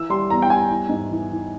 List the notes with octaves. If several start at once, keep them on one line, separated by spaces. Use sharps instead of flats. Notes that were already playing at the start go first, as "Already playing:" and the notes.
Already playing: E3 E6
G3 C6
E2 A#5
G5
G3 G#5
E3
G#2
E3
E3